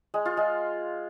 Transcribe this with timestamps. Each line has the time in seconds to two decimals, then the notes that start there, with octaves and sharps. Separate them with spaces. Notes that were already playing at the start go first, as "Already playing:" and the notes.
0.14 G#3
0.25 F4
0.37 G#3